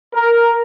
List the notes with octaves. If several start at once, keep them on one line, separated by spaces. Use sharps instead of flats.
A#4